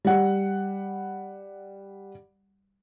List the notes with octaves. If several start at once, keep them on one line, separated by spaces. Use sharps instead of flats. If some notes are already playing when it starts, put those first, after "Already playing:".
G3 F#5